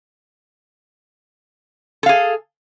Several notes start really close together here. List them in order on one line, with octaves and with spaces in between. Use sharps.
A4 F5 G#4